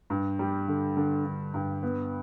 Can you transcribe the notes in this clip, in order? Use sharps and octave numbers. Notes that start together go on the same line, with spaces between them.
G2
G3
D3
D3
D3
G2
B3